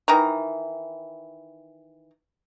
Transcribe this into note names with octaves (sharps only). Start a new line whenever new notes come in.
D#3 E3 A#5